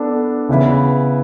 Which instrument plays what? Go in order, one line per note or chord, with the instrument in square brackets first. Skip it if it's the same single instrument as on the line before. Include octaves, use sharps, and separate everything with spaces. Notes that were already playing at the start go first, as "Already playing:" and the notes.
Already playing: [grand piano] B3 D4 A4 D5
C#3 E3 B3 E4 B4